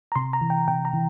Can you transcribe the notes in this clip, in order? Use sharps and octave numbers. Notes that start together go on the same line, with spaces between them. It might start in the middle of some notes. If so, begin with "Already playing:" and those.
A#5
C3 C6
A#5
E3
G5
C3 G5
A#5
E3